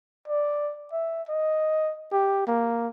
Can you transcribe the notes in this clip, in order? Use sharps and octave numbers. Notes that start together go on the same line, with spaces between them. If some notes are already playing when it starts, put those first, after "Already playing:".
D5
E5
D#5
G4
A#3